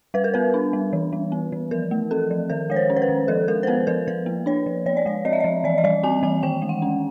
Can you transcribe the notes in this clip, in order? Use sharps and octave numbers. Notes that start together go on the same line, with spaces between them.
G3 B4
A#4
B3 B4
D4
G3
E3
G3
B3
E3
F3 A#4
A3
C4 A4
F3
D#3 A#4
G#3 C#5
C5
C#4
C5
B4
D#3
F3 A4
G#3 A#4
C5
B3 B4
F3 A#4
F3 B4
A#3
D4 C#5
F3
F3 C#5
D5
G#3 C#5
C4 D#5
E5
F3 D#5
E3 D5
D#5
G3 D5
C4 G#5
E3 G#5
D#3 G5
G#3
F#5
C#4